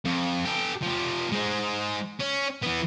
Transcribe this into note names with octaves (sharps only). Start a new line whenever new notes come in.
F2
G4 A4
F3 G4
G#3 C5
C#4
E3 B3